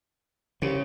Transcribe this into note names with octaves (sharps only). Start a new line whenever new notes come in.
C2 C#3